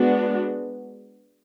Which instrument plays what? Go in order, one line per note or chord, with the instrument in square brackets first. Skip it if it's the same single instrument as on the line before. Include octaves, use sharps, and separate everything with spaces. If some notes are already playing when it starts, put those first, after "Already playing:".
Already playing: [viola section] G#3 B3 D4 F#4